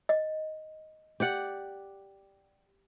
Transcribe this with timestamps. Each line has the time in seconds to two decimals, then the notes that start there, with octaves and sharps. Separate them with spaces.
0.09 D#5
1.20 G4 D5 F#5